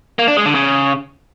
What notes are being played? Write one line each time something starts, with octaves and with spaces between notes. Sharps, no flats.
A#3
D4
G#3
D3
C#3